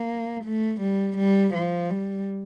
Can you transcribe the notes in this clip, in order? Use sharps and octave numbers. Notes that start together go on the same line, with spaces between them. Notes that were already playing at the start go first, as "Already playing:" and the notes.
Already playing: A#3
A3
G3
G3
F3
G3